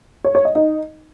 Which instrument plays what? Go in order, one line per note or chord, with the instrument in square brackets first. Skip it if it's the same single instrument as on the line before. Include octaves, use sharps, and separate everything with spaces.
[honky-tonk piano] C#5
C#5
D#5
D#4